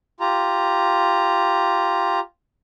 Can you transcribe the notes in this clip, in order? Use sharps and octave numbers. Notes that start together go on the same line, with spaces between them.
F4 G4 A#5